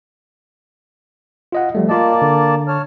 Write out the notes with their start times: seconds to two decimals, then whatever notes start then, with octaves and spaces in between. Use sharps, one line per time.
1.52 F4 D#5 F#5
1.75 F3 G3 A3
1.89 A#3 F4 D5 D#5 A5
2.22 D3
2.68 C#5 A5 F6